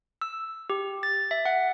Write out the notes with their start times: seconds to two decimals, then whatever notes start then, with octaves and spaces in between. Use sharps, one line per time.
0.22 E6
0.70 G4
1.03 A6
1.31 E5
1.45 F#5